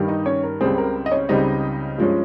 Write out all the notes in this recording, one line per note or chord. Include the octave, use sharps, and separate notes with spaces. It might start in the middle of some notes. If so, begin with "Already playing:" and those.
Already playing: G2 D#3 G3
D#4 D#5
C#4 C#5
A#4
C#2 C#3 G3 C4 G#4
A#4
D#5
C#4 C#5
C#2 C#3 G3 C4 D#4 D#5
G2 F3 G#3 C#4